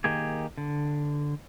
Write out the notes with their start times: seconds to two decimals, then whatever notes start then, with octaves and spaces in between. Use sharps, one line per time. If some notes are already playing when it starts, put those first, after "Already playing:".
0.04 D#3 A#3 G4 G#4
0.58 D3